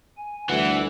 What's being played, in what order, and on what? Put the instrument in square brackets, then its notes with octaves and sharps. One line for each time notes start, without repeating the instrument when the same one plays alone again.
[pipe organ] G#5
[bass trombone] D2 [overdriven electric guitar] E3 [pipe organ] G3 E5 [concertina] F#5